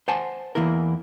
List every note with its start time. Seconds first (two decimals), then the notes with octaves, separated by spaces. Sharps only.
0.08 C5 F#5 G#5 A5
0.55 E2 A#2 E3 A#3 E4 A#4